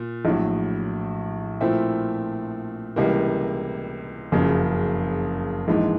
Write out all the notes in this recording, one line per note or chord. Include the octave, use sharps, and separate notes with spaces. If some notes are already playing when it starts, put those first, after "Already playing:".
Already playing: A#2
A#1 A2 F#3
A#2 F3 A3 C4 E4
C#2 C3 E3 G3 A#3
F#1 F2 C#3 F#3
A#1 G#2 E3 G#3